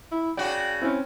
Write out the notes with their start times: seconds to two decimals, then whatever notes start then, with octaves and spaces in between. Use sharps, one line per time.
0.12 E4
0.37 C#3 F#4 D5 G5
0.82 C4 C#4 E4